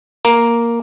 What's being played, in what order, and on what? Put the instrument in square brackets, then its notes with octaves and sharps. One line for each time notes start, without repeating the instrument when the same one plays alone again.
[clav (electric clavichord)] A#3